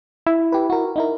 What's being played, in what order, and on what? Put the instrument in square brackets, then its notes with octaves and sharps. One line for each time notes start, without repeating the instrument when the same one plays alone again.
[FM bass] E4
[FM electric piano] G4 B4
F#4 A#4
D#4 E4 A#4